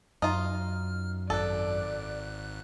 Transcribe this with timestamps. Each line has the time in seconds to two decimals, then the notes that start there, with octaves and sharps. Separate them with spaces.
0.22 F#2 D#4 F4 F6
1.30 G#1 G#2 A4 D5 F#6